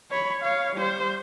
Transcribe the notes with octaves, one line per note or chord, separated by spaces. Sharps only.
C#5 B5
C#5 F5
G3 C5